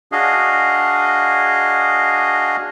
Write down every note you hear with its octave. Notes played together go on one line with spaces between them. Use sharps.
D4 F#4 G#4 D#5 F5